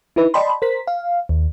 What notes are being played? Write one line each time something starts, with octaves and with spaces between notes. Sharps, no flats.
D#4 E4 B4
D5 D#5 G5 A5 B5 C6
A#4 C5 B6
F5
D#2